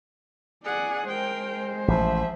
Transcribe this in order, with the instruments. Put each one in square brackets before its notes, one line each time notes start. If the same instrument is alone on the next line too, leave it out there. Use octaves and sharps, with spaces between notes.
[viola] G#4 F#5 [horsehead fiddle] D5 G#5
[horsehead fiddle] G#3 C5 [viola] A#4 G5
[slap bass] A1 [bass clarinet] F3 [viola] E5